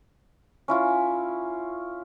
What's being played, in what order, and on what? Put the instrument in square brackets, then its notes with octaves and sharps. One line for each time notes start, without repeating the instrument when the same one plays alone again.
[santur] C#4 E4 F4